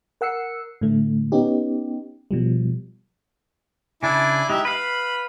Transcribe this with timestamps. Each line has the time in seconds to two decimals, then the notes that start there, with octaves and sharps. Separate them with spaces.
0.21 A#4 F#5 E6 C7 C#7
0.81 A2 D3 A3
1.32 B3 C#4 D#4 G4
2.31 B2 F3 G3
4.03 C#3 D4 E4 G#5 D6
4.50 G#3 D#4 G4 E5
4.65 B4 F5 B5